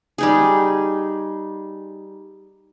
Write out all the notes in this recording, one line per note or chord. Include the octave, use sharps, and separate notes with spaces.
G3 D#4 G#4